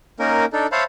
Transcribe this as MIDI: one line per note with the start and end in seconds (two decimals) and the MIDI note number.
0.19 0.45 58
0.19 0.45 61
0.19 0.45 63
0.19 0.45 70
0.53 0.67 62
0.53 0.67 63
0.53 0.67 69
0.72 0.84 72
0.72 0.84 73
0.72 0.84 76
0.72 0.84 77
0.72 0.84 81
0.72 0.84 83